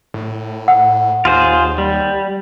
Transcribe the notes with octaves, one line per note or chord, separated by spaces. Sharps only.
A2
F#5
D#2 F4 G#4 C5
G3